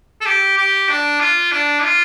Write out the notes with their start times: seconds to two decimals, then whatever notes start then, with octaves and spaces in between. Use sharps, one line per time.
0.21 A4
0.26 G4
0.58 G4
0.89 D4
1.20 F4
1.52 D4
1.84 F4